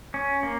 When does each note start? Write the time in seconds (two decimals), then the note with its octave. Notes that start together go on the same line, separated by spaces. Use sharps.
0.14 C#4
0.43 A#3